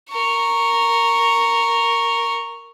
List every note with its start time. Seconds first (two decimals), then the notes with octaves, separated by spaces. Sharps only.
0.10 A#4 C#6